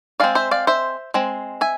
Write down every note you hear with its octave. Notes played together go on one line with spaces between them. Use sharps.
G#3 C4 D5 F5
C5 E5
D5 F5
C5 E5
G#3 C4
E5 G#5